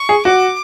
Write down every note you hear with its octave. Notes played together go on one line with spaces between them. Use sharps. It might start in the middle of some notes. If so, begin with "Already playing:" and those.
Already playing: C#6
G#4
F#4 D6